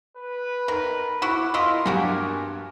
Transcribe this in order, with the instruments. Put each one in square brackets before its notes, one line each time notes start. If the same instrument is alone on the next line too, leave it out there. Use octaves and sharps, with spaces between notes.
[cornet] B4
[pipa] D#3 [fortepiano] A#4
[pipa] E4 F#4 [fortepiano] D6
[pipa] E4 F4 D#5 [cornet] A#4 [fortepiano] E6
[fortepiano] G2 G#5 D6 [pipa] A#3 F#4 G4